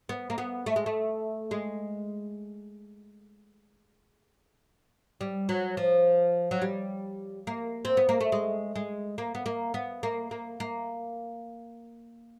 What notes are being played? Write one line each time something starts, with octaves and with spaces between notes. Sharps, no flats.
B3
A#3
B3
A3
G#3
A3
G#3
G3
F#3
F3
F#3
G3
A#3
C4
B3
A#3
A3
G#3
G#3
A#3
B3
A#3
B3
A#3
A#3
A#3